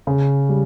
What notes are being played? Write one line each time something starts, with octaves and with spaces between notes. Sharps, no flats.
C#3
G3